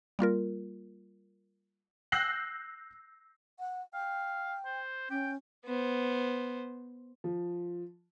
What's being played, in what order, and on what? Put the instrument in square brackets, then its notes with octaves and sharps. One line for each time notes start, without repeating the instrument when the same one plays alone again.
[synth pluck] G3 A#3 F4 A#4
[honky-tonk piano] E6 F#6 G6 A#6 C7 F#7
[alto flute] F#5
[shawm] F5 [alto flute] G5
[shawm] C5
[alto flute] C#4 [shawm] G5
[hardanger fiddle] B3 C5
[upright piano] F3